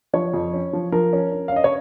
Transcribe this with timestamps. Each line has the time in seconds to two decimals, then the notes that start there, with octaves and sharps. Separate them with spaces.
0.13 F3 C#5
0.34 F2
0.53 C#4
0.73 F3
0.92 F3 A#4
1.13 C#4
1.32 C#4
1.48 F5
1.52 C#4 D#5
1.64 C#5